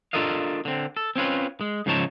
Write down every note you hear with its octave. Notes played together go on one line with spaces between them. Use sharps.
D4 F4 A4 A#4 D#5 F5
D3 C4
A4
C4 C#4 F4 B4
G#3
G#2 C#3 F3 D#4 C#5 A5